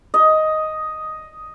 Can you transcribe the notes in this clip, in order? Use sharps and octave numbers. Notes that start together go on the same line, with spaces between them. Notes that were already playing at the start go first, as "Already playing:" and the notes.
D#5